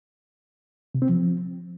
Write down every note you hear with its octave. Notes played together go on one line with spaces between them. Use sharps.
C3
C4
F3